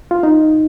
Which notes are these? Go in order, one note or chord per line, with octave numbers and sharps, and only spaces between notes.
F4
D#4